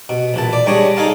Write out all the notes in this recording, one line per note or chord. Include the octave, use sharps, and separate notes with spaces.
B2
A#1 E3 A5
D5
G3 G#3 D4 C#5 D#5
D#4 G#4 A4 F5 A5